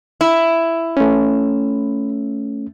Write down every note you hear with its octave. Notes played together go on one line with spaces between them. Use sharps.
E4
A3 C#4